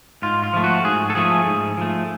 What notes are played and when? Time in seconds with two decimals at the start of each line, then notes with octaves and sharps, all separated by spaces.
0.22 G#2 F4
0.43 F4
0.53 F3 A3
0.64 F#4
0.84 G#2 G#4
1.10 A4
1.15 F3 A3 G#4
1.46 G#2
1.77 F3 A3